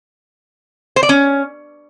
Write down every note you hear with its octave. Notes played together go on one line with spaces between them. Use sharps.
C5
D5
C#4